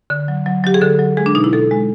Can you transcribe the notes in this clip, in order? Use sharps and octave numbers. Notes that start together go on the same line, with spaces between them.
D3
F#3
F#3
F#3 G4
G#4
D3 A4
F#3
G#3 G#4
D4
B2 D#4
E4
B2 A4
G#3